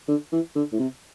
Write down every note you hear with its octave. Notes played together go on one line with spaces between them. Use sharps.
D3
E3
D3
A2
C3